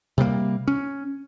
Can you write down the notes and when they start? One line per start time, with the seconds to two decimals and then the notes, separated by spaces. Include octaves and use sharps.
0.18 C3 G3 G#3 A#3
0.68 C#4